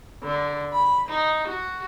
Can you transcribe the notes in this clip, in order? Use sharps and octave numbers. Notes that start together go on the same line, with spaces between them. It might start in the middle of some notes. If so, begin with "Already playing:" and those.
D3
B5
D#4
F#4